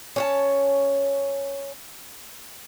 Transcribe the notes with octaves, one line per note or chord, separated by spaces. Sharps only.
C#4 C#5 A5